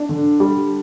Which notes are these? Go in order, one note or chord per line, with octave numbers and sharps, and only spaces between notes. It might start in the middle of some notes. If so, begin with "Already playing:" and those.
Already playing: D4
D3
G3